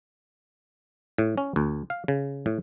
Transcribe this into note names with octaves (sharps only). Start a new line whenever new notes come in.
A2
C#4
D2
F5
C#3
A2